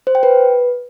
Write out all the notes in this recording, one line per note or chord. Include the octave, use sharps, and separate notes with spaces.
C5
G5
B4